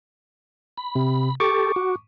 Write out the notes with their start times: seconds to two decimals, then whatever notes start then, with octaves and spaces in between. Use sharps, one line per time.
0.78 B5
0.95 C3
1.40 G4 A4 C#6 D6
1.76 F#4